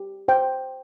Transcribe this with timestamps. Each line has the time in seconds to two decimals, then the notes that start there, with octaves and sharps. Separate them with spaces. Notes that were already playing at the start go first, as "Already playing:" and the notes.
Already playing: G4
0.28 C5 G5